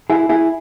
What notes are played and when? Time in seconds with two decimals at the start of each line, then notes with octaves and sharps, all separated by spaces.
0.10 E4 G#4
0.29 E4 G#4